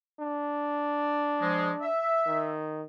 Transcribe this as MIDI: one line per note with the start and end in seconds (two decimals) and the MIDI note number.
0.20 1.87 62
1.41 1.72 53
1.41 1.72 56
1.82 2.51 76
2.26 2.83 51